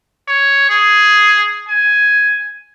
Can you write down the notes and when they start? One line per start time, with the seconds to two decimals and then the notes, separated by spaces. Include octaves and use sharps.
0.28 C#5
0.69 G#4
1.69 G#5